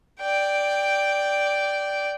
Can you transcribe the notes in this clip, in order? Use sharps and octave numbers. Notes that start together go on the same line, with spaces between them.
D5 G5